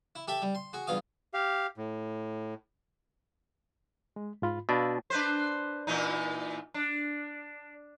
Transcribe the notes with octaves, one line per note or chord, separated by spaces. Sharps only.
E4
G4 A4 E5
G3
C6
F#4 G#4
E2 G2 F4 F5 D#6
G4 F5
A2
G#3
G#2 F4 B5
B2 D4 F5 B5 E6
D4 B4 C5
A#2 E3 D#4
D4